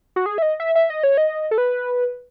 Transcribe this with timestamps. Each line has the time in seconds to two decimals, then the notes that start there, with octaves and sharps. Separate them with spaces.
0.16 F#4
0.26 G#4
0.38 E5
0.42 D#5
0.60 E5
0.75 E5
0.90 D#5
1.03 C#5
1.17 D#5
1.51 A4
1.58 B4